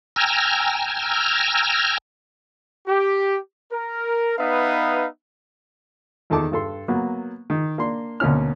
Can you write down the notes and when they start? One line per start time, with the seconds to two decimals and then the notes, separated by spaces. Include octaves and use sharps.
0.16 G5 G#5 A#5 E6 F6
2.87 G4
3.71 A#4
4.37 B3 D#4 B4 E5 F5
6.30 E2 D#3 A4 A5 D6
6.52 G2 A4 C6
6.88 F#3 A#3 B3
7.50 D#3
7.78 A#3 D4 C6
8.20 D2 B2 A#3 C#4 F6